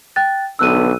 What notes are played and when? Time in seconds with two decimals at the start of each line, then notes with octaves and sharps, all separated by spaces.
0.16 G5 F#6 A6
0.59 B1 D3 B3 E6 F#6 D#7